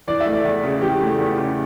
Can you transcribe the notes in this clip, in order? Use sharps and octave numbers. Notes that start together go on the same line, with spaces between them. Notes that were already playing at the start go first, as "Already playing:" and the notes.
E3 D5
E5
A3
D5
E2
C#3
E3 G4
A3
E2
C#3